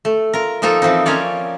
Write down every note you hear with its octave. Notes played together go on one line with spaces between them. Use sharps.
A3
F4 A#4
F3 A#3 D#4 F4 A4
E3 F3 C4 D#4
A#3 C#4 F4 C#5 D5